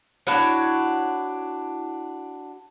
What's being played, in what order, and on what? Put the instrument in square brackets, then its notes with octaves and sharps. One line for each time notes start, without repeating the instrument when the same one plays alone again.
[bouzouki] D4 E4 F#4 C#5